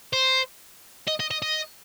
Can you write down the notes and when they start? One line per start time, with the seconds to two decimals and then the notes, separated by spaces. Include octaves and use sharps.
0.13 C5
1.07 D#5
1.20 D#5
1.31 D#5
1.42 D#5